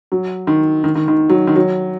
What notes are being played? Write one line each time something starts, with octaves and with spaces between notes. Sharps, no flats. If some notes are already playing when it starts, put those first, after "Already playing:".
F#3
D#3
D#3
D#3
D#3
F#3
D#3
F#3